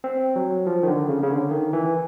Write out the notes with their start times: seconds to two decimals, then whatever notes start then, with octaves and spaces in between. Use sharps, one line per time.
0.04 C4
0.36 F#3
0.66 F3
0.83 D#3
0.87 D3
1.09 C#3
1.23 C#3
1.30 D3
1.51 D#3
1.73 E3